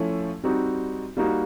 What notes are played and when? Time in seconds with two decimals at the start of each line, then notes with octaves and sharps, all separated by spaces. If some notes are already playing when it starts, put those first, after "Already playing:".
Already playing: F3 A3 C#4 E4
0.44 G3 C4 D#4 F#4
1.17 G3 A#3 D#4 F#4